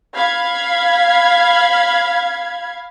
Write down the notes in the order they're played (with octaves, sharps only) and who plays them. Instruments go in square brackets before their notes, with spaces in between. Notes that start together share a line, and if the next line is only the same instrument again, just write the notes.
[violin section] F5 B5 G#6